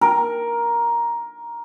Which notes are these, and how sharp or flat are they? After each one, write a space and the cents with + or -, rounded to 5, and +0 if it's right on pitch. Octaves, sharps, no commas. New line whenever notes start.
A#4 +10